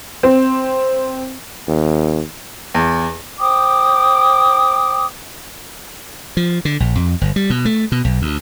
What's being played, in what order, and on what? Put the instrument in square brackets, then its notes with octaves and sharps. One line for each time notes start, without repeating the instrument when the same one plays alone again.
[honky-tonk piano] C4
[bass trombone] D#2
[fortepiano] E2
[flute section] C5 G5 D6 D#6
[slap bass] F3
D3
A#1
F2
G1
G3
B2
A3
B2
B1
D2